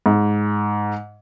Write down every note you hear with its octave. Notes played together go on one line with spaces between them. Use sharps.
G#2